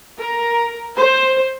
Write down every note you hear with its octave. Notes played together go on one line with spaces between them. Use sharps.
A#4
C5